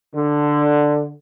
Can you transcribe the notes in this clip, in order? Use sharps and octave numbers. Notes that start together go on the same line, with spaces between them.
D3